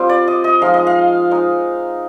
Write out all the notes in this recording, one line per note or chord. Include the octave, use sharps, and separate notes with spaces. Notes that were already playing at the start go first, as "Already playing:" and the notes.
Already playing: G3 C4 F4
D5
D#5
D#5
F3 G#3 D#4 F5
D#5
F5
G#3 D#4